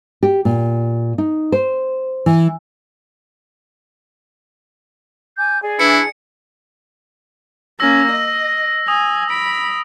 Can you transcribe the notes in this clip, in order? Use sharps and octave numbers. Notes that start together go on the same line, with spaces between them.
G4
A#2
D#4
C5
E3
G#5 D6 G6
G#4 D5 G#5
E3 D4 E4 C#7
A#3 C#4 E6 A#6
D#5
G#5 D#6
B5 D7